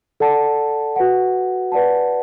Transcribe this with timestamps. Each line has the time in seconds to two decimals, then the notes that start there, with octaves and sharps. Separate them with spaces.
0.20 A4 D5 F#5 A5
0.96 F#4 B4 F#5
1.72 B4 D5 F#5 A5